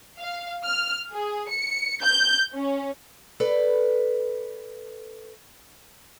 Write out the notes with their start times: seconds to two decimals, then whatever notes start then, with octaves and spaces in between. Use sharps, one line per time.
0.19 F5
0.65 F6
1.11 G#4
1.48 C#7
2.01 G6
2.53 C#4
3.40 A4 B4 D5